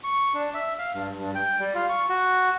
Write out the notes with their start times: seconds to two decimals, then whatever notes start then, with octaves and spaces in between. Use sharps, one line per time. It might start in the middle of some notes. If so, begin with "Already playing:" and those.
0.04 C#6
0.34 D4
0.54 E5
0.79 F5
0.94 G2
1.18 G2
1.35 G5
1.60 G3
1.75 F4
1.89 C#6
2.09 F#4